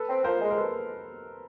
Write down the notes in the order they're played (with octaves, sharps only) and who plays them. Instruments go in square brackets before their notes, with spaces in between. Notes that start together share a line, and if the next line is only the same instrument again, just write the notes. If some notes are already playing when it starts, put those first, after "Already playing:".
Already playing: [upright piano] A4 B4
[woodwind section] C4
[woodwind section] F3 [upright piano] A#4 C5
[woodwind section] G#3
[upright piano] A#4
A4 B4